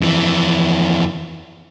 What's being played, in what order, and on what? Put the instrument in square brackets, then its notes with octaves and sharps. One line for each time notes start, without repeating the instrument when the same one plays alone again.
[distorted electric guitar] F2 E3